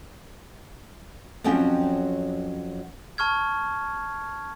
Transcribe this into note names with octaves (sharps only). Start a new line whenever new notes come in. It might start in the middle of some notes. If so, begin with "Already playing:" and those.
F2 F#3 C#4 C#5 G5
A5 C#6 F6 G#6